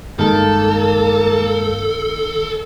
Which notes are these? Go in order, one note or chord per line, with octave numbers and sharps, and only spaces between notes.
G2 D#3 G#3 A#3 A4 A5